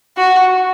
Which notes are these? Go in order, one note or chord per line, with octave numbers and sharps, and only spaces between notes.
F#4